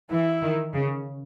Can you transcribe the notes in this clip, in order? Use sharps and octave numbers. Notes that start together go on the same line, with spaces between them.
E3 E4
D#3
C#3